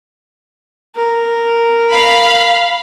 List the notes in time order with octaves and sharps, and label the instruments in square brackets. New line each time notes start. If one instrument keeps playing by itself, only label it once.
[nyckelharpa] A#4
[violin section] F5 B5